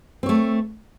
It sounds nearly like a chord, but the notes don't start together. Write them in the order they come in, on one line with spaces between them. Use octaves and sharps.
C4 C#5 A3